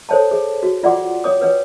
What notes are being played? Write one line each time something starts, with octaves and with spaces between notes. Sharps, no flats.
A4 C5 C#5 G5 A5
G#4
F#4
F4 D5 F#5 G5 C6 D6
C#5 G5 D6 D#6
B4 C#5 G5